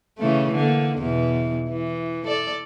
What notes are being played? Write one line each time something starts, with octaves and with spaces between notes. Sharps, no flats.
C#3 E3 A3
D3 A#3
E2 B2 E3
E3
A4 D5